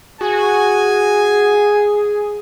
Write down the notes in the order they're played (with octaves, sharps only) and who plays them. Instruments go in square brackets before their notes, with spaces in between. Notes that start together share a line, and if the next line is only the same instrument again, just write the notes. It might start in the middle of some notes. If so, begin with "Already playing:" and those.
[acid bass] F#4 [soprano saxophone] G#4 [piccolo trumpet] G#5